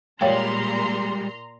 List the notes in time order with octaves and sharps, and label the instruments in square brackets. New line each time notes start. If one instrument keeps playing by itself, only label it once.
[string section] A#2 [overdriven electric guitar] G3 G#3 [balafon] C#5 F5 G5 [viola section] A#5 C6